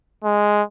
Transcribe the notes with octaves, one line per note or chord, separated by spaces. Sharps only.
G#3